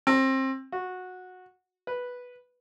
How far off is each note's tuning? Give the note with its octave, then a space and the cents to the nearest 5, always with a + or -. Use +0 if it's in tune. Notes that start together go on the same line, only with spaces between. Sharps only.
C4 +25
F#4 -15
B4 -5